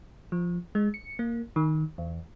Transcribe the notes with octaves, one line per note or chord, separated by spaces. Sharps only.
F3
G#3
C#7
A#3
D#3
E2